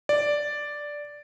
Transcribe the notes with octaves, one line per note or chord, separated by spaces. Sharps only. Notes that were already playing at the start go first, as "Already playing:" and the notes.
D5